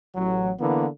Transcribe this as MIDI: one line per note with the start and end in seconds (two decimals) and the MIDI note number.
0.15 0.51 33
0.15 0.51 54
0.59 0.86 50
0.59 0.86 52
0.59 0.86 58
0.59 0.86 59
0.59 0.86 64